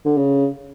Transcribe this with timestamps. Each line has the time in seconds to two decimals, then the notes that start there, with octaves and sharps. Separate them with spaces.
0.06 D3
0.17 C#3